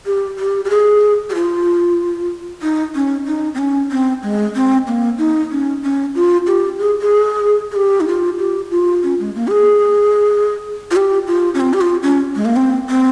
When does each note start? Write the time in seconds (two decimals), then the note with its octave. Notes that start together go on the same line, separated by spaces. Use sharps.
0.06 G4
0.38 G4
0.65 G4
0.70 G#4
1.30 G4
1.35 F4
2.62 D#4
2.95 C#4
3.26 D#4
3.54 C4
3.58 C#4
3.91 C4
4.23 G#3
4.55 C4
4.87 A#3
5.18 D#4
5.51 C#4
5.83 C#4
6.15 F4
6.47 G4
6.79 G#4
7.01 G#4
7.72 G#4
7.76 G4
8.01 D#4
8.08 F4
8.39 G4
8.71 F4
9.03 C#4
9.20 G#3
9.36 A#3
9.48 G4
9.51 G#4
10.91 F4
10.96 G4
11.27 F4
11.54 C#4
11.61 C4
11.73 G4
11.81 F4
12.03 C#4
12.36 G#3
12.45 A#3
12.56 C4
12.88 C4